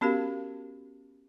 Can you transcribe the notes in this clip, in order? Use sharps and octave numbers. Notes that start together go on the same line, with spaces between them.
B3 C#4 F#4 G4 A#4 F5